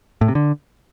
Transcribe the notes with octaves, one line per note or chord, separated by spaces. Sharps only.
A2
C3
D3